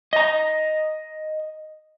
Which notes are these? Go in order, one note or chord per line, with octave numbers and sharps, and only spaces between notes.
D#5 A#5